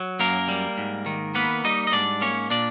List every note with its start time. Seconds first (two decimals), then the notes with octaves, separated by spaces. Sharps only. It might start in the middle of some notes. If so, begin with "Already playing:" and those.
Already playing: F#3
0.20 F#2 A#3 A#4
0.48 G3
0.78 G#2
1.06 D#3
1.35 A#3 B3 B4
1.64 G3 D#4 D#5
1.87 D#5
1.92 G#2 D4 D5
2.21 A#3 C#4 C#5
2.50 A#2 D4 D5